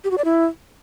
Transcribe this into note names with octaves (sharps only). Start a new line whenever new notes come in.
G4
F#4
D5
E4